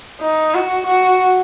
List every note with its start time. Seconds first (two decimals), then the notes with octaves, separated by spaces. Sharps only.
0.21 D#4
0.54 F#4
0.86 F#4